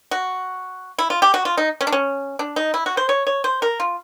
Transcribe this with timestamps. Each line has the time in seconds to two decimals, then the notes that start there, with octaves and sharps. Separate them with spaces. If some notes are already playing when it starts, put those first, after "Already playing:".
0.11 F#4
0.98 E4
1.10 F4
1.22 G4
1.34 F#4
1.45 F4
1.57 D#4
1.81 C#4
1.87 D4
1.93 C#4
2.39 D4
2.56 D#4
2.74 E4
2.86 F#4
2.97 C5
3.09 C#5
3.27 C#5
3.44 C5
3.62 A#4
3.80 F4